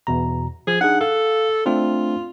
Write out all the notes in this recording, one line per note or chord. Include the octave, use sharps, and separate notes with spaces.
E2 B2 A#5
F3 G#4
D4 D#4 G#4 F#5
A4 F5
A3 C4 D4 F4